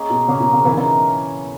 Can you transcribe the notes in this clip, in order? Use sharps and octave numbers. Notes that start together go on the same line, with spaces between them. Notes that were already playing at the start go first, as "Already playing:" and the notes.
Already playing: A#3 C#4 G#4 D#5
B2
C#3 A#3 C#4 G#4
B2
C#3
C#3 E3 D#4 A#4 E5
C#3 E3